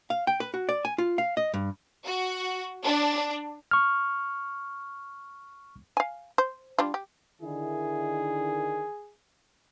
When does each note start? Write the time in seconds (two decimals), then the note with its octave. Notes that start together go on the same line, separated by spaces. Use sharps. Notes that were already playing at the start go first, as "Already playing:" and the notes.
0.10 F5
0.27 G5
0.40 B4
0.54 F#4
0.69 D5
0.85 G#5
0.98 F4
1.18 F5
1.37 D#5
1.54 G2
2.06 F#4
2.85 D4
3.71 C#6 F6
5.97 F5 G#5
6.38 C5
6.78 G3 D4 F4
6.94 G4
7.42 D3 D#3 E4 G#4